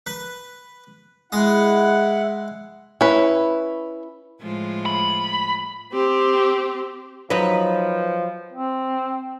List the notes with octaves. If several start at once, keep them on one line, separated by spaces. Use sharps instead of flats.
B4
G#3 E4 F#5 D#6
C#4 E4 B4
A2 F3 G#3
B5
C4 G4
F3 F#3 D#4 B4
C4